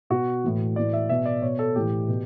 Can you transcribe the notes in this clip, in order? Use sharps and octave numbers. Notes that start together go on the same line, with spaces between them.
B2 F#4
A2 E3
A2 E3 D5
E5
B2 E5
D5
B2 C#5
A4
A2 E3 G4
B2